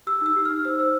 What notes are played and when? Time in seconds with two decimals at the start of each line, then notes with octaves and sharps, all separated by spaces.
0.07 G4 E6
0.21 D#4 E6
0.36 G4
0.45 F6
0.50 D#4
0.65 C5 E6
0.79 C5